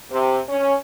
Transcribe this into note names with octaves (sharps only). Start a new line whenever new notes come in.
C3
C#4